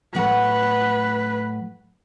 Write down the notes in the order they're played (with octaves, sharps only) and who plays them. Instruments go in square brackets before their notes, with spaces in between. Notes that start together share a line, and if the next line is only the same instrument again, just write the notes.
[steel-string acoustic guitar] A2 F#3 F#5 [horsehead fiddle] B4